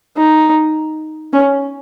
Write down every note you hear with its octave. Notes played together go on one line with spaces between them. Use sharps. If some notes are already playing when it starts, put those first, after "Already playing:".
D#4
C#4